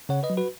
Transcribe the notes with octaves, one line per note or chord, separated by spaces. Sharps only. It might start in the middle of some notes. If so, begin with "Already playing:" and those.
C#3 C#5 F#5
B4 D#5
F#3
F#4 B4